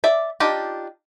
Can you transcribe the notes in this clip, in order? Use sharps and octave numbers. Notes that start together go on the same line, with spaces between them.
D5 E5
D4 D#4 F4 G4